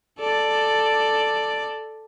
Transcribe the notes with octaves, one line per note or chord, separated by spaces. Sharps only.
A4 D5